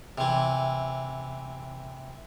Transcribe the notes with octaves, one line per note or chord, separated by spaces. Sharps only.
C3 E3